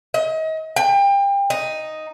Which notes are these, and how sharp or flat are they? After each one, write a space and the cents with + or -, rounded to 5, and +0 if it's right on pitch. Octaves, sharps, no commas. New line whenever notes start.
D#5 +35
G5 +30
D#4 +0